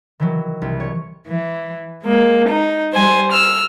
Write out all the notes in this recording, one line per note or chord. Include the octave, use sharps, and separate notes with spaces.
D#3 E3 F#3
C2
C#5
E3
G#3 A#3
D#4
G3 C5 G#5
E6 F6